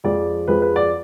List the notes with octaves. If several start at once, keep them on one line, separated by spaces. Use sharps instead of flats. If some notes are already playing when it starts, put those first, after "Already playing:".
F2 F3 G#3 D5
F2 F3 G#3 B4
B4
D5